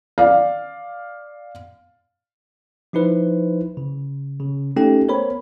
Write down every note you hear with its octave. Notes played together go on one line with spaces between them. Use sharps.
D5 F5
F3 D#4 E4 B4 C5
C#3
C#3
A3 C#4 D#4 G4 A4 G5
B3 A#4 C5 C#5 B5